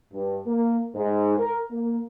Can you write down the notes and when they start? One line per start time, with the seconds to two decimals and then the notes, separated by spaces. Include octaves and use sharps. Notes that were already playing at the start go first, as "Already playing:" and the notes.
0.13 G2
0.46 A#3
0.95 G#2
1.37 A#4
1.71 A#3